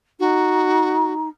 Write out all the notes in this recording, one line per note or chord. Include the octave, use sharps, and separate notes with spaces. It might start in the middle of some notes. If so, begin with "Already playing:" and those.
D#4 F#4